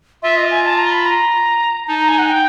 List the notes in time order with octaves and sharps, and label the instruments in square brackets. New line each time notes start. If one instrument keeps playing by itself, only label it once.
[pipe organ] F4 [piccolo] E5
[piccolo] D#5
G#5
A5
A#5
B5
A#5
[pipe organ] D#4 [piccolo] A5
[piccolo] A#5
G#5
F#5
G5